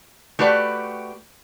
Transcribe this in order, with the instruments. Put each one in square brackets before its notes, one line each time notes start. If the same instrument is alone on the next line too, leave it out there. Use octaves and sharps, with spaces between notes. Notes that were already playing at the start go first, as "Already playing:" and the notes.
[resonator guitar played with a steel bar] A3 F#4 G4 B4 D5 G5